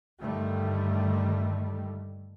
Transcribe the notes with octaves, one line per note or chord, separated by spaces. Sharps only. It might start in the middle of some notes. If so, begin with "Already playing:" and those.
G2 D3 D#3 G3 A3